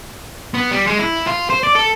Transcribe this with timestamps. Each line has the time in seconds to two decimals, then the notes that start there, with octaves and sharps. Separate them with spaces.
0.54 B3
0.71 G3
0.87 G#3
0.99 E4
1.27 F4
1.50 C5
1.63 D5
1.75 A4